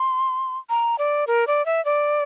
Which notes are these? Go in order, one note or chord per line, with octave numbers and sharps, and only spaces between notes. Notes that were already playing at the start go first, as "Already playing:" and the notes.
Already playing: C6
A#5
D5
A#4
D5
E5
D5